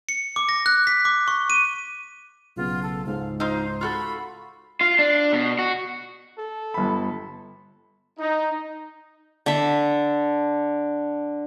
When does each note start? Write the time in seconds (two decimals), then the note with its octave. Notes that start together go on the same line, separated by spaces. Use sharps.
0.09 C#7
0.36 D6
0.49 A#6
0.66 F#6
0.87 B6
1.05 D6
1.28 C#6
1.50 D#7
2.57 B1 C#3 B3 F4
2.83 A4
3.06 C#2 G#2 F5
3.40 D#4 F4 C5
3.81 F4 F#4 A4 B5
4.81 F4
4.99 D4
5.33 B2
5.59 F#4
6.38 A4
6.74 G1 B5
8.19 D#4
9.46 D3 E5